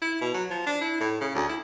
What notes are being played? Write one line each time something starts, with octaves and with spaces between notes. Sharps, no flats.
E4
B2
F#3
F3
D4
E4
A2
C#3
D2
E4